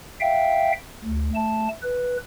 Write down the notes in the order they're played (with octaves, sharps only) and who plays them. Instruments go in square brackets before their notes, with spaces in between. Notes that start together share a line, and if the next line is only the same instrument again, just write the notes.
[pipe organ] E5 F5 G5
D2
A3 A5
B4